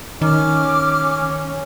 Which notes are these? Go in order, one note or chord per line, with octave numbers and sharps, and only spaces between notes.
D#3 C#4 D6 F6